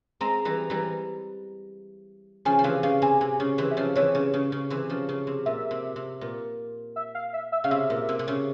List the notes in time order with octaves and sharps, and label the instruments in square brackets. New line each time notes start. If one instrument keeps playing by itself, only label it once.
[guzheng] G#3 C4 [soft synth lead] A#5
[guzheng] E3 G3
E3 G3
[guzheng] C#3 F3 [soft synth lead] G#5
[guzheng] F3
[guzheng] C3 E3 [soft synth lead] F5
[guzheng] C#3 [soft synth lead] F5
[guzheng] C3 [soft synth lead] G#5
[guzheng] C3 [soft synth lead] G#5
[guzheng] C#3
C3 E3
[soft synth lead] E5
[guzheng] C#3 F3
[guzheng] C3 E3 [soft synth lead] C#5
[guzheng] C#3
C#3
C#3
C3 E3
C#3 F3
C#3
C3
[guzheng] A#2 [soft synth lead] E5
[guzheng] C3
C3
A#2
[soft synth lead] E5
F5
E5
E5
[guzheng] C#3 [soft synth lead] F5
[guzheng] C3 [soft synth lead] E5
[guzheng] A#2
C3
C3
C#3